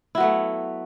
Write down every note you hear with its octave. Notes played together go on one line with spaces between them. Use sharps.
F#3 A3 B3 E4